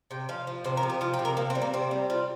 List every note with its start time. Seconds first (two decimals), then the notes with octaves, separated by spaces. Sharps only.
0.11 C3 G5
0.29 F3 F5
0.47 F3
0.64 C3 C5
0.77 A#4
0.83 F3
0.90 G4
1.01 F3 F4
1.14 G4
1.19 C3
1.25 A#4
1.37 C3 A#3
1.50 C4
1.55 G3
1.62 A#3
1.74 C3 C4
1.91 G3
2.10 G3 F4